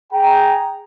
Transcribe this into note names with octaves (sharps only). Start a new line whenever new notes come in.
G#4 G5 A#5